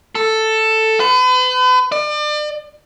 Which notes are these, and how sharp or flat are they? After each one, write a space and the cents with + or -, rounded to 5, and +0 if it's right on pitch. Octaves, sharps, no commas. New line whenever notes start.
A4 +5
B4 +40
D5 +35